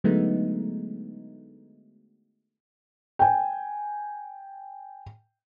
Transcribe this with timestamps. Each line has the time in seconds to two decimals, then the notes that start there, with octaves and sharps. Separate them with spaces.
0.04 D3 F#3 G#3 A3 B3 D#4
3.19 G5 G#5